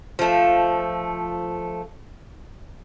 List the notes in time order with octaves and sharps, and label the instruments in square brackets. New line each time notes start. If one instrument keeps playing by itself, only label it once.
[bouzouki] F3 A3